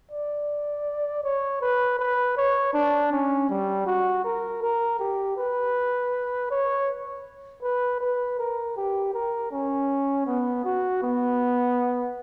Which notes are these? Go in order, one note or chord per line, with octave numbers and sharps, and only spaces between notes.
D5
C#5
B4
B4
C#5
D4
C#4
G3
F#4
A#4
A#4
G4
B4
C#5
B4
B4
A#4
G4
A#4
C#4
B3
F#4
B3